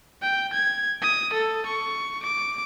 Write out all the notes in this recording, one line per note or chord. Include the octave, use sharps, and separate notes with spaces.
G5
G#6
D#6
A4
C#6
D6